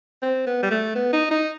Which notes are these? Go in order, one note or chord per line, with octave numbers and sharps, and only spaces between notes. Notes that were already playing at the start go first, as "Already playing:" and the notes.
C4
B3
G3
A3
B3
D#4
D#4